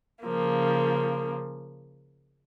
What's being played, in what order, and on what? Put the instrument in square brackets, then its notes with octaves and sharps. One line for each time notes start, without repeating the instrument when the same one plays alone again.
[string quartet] C#3 F3 A#3